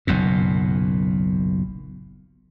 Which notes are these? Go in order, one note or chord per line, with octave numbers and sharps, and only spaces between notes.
F#1 B1 F#2 A#2